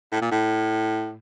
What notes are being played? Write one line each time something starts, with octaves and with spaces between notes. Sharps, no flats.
A2
A#2
A2